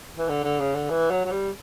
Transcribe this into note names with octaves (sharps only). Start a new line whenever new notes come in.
E3
D3
D3
C#3
D3
E3
F#3
F#3
G3